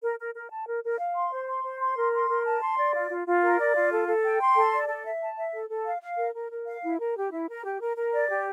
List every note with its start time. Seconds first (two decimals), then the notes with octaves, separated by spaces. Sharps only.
0.02 A#4
0.18 A#4
0.33 A#4
0.50 A5
0.67 A#4
0.83 A#4
0.99 F5
1.15 C6
1.32 C5
1.47 C6
1.63 C5
1.80 C6
1.96 A#4
2.12 C6
2.29 A#4
2.45 A5
2.61 C6
2.77 D5
2.94 F4
3.10 F4
3.26 F4
3.42 A#4
3.59 D5
3.75 F4
3.91 A4
4.07 A4
4.24 G5
4.40 C6
4.56 A4
4.71 D5
4.88 A4
5.05 E5
5.21 A5
5.37 E5
5.54 A4
5.69 A4
5.85 F5
6.01 F5
6.18 A#4
6.35 A#4
6.51 A#4
6.67 F5
6.83 E4
6.99 A#4
7.16 G4
7.31 E4
7.48 A#4
7.64 G4
7.80 A#4
7.96 A#4
8.13 D5
8.29 G4